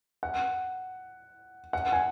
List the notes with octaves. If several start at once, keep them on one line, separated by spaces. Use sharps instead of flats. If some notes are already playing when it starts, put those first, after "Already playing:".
F#5
F#5
G#5